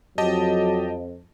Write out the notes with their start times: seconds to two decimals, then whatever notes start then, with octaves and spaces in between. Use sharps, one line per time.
0.18 F2 F#3 G4 D#5 A5